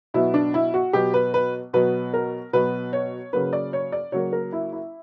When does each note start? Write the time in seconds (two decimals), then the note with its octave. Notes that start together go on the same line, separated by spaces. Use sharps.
0.14 B2 F#3 B3 E4
0.34 D4
0.54 E4
0.74 F#4
0.93 B2 F#3 B3 G4
1.14 B4
1.34 B4
1.73 B2 F#3 B3 B4
2.14 A#4
2.53 B2 F#3 B3 B4
2.93 C#5
3.33 C#3 F#3 A#3 B4
3.53 D5
3.73 C#5
3.92 D5
4.12 C#3 F#3 A#3 C#5
4.33 A#4
4.53 E4
4.73 E4